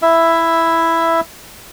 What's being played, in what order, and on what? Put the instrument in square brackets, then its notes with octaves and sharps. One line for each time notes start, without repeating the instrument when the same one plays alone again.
[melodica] E4 E5